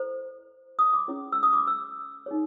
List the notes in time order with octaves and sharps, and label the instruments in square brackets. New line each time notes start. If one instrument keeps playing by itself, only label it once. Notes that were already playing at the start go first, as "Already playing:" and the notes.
Already playing: [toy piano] E4 A4 C5
D#6
D6
C#4 E4 G#4 C#5
E6
D#6
D6
E6
D#4 G#4 C#5